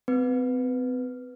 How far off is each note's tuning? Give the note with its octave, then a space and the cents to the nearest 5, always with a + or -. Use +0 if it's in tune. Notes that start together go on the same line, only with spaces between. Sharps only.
C4 -40 B4 +0